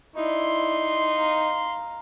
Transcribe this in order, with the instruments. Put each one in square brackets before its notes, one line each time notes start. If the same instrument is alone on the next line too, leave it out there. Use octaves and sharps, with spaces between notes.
[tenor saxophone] D#4 [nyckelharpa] E4 D5 [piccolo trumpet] C6
[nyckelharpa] F5 A#5